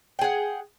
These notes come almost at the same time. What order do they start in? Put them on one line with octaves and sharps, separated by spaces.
G5 G#4 F#5